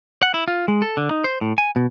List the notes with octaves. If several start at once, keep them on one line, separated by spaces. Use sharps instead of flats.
F#5
E4
F4
G#3
A4
D3
D#4
C5
A2
G#5
B2